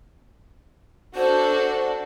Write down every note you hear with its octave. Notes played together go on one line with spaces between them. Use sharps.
D4 F#4 A4 C5